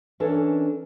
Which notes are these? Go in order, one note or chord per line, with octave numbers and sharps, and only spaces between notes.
E3 C#4 D4 A4 A#4